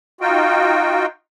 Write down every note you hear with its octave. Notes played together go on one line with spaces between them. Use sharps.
D#4 F4 F#4 G5